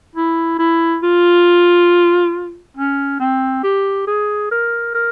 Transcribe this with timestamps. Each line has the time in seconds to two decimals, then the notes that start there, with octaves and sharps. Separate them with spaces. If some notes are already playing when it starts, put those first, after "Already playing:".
0.16 E4
0.59 E4
1.03 F4
2.77 C#4
3.20 C4
3.63 G4
4.07 G#4
4.51 A#4
4.94 A#4